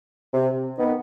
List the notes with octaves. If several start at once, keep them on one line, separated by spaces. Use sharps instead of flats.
C3
D#3 B3